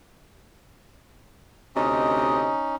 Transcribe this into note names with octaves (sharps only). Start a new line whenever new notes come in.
D2 C3 C#4 D#4 D#5